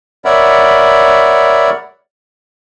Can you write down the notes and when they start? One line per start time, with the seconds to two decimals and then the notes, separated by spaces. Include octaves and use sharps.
0.25 A#4 C#5 D5 E5 F#5 B5